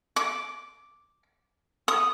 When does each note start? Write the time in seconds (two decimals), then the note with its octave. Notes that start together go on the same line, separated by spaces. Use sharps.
0.16 D6
1.88 D#6